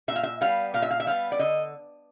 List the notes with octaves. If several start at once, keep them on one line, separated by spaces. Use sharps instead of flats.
A#2 E5
F5
E5
G3 B3 F5
A#2 F5
E5
F5
E5
G3 B3 F5
D5
D3 D#5